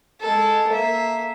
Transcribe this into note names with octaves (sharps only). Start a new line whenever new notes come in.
G#3 A4
A#3 E5